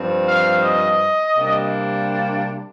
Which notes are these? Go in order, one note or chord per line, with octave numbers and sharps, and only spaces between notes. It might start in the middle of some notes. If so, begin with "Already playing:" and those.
Already playing: G2 F3 C4
F5
D#5
C3 G3 A#3 D4